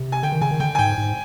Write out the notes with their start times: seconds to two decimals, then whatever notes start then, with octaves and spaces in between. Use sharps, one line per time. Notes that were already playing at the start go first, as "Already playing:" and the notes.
Already playing: C3
0.12 G#5
0.22 D3 G5
0.32 D#3
0.41 C#3 G#5
0.51 D#3
0.60 D3 G5
0.75 G#5
0.78 G#2 G5
0.98 G#2